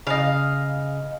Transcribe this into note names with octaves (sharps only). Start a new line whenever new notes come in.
C#3 D#5 F5